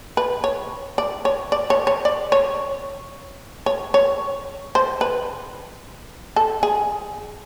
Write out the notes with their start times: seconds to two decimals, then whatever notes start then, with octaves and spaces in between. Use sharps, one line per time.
0.17 B4
0.44 C#5
0.98 D5
1.25 C#5
1.52 D5
1.70 C#5
1.87 C#5
2.05 D5
2.32 C#5
3.66 C#5
3.94 C#5
4.75 C5
5.01 B4
6.36 A4
6.63 G#4